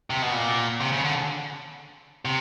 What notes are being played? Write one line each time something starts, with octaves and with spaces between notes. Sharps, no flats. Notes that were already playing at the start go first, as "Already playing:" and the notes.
C3
B2
A#2
C3
C#3
D3
C3